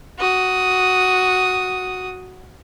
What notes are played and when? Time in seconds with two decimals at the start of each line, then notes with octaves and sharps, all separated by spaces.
0.19 F#4 D#6